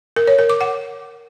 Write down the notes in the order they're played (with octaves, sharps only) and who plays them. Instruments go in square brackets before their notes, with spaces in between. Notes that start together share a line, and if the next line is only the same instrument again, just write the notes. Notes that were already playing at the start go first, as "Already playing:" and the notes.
[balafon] A#4
C#5
A#4
D6
F#5